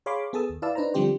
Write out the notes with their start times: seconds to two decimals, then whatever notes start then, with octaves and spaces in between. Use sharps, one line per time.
0.06 G#4 C#5 F5 B5 C6 D6
0.33 B3 G#4 A4 A5 D#6 E6
0.50 D#2
0.62 E4 B4 D5 F5 A5 E6
0.75 D4 D#4 B4 C5 A#5
0.94 D3 F3 G3 C4 G4 C5